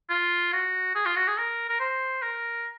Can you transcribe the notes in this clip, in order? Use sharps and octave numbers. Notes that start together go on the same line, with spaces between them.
F4
F#4
G#4
F4
F#4
G#4
A#4
A#4
C5
A#4